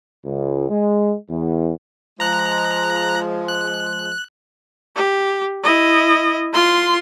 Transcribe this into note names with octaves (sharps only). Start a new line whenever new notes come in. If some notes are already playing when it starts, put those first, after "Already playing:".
C#2
G#3
E2
F3 G#3 A#5 F#6
F#6
G4
E4 D#5
F4 C6